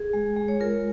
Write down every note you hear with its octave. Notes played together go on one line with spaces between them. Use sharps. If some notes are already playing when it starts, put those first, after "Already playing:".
Already playing: G#4
G#3
G#3
C#5
F4 A#4